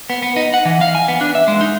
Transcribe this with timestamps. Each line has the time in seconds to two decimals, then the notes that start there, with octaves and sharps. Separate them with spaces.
0.10 B3
0.23 B3
0.36 D#4
0.54 F#5
0.65 E3
0.81 F5
0.95 G#5
1.08 B3
1.21 D4
1.35 E5
1.48 G#3
1.61 D#4